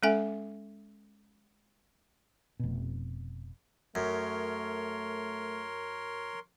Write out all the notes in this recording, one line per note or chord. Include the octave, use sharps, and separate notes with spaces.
G#3 C#4 A4 E5 G#5
F1 B2
F#2 A3 A#4 C#5 C6